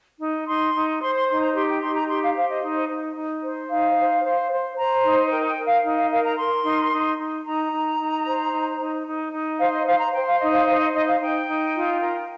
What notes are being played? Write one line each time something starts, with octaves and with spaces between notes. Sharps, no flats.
D#4
D#4 C6
D#4
C5 C6
C6
D#4 C6
A#5
G4 C6
G5
D#4 C6
A#5
G4 C6
F5
C5 F5
D#5
D#4
D#4
D#4
C5
D#4 F5
C5
C5
C5
C5 A#5
D#4
A#4 G5
G5
A#4
F5
D#4
F5
A#4 F5
A#5
A#4 C6
D#4
D#4
D#4
D#4 A#5
D#4
D#4
C5
D#4
D#4
D#4
D#4
C5 F5
D#5
C5 F5
A#5
C5 G5
F5
D#4 D#5
F5
C5 F5
D#5
D#4 D#5
F5
D#4 G5
D#4
F4
A#4